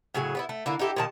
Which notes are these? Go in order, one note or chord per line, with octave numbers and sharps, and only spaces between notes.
A2 C#3 F#3 G#4
B3 D4 E4
A3
D3 A#3 E4
D#4 E4 G4 A4
A#2 D#3 A5